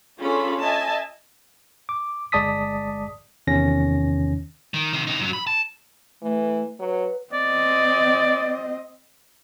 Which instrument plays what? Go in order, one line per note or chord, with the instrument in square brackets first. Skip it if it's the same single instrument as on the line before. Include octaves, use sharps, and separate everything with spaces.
[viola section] C#4 D4 F4 G#4 A4 B5
D#5 E5 G#5 A5
[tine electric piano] D6
G1 G#3 D5 A5 D#6 B6
E2 C3 D#3 C#4 A#6
[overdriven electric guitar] D#3
C3 D#3
C3 D#4
F#2 F#3
B5
A5
[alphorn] E3 [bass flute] A3
[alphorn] F#3 [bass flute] B4
[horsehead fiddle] C4 D#5 [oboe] D5